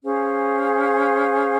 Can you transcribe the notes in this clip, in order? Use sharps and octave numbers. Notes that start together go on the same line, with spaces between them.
C#4 G#4 C5 F5